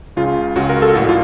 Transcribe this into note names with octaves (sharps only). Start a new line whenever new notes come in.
C#2 C#3 F4
C#2 C#3 F#4
A#4
A4
A#1 A2 F#4
F4